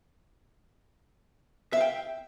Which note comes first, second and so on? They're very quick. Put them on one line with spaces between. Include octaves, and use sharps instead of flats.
E5 F5 G5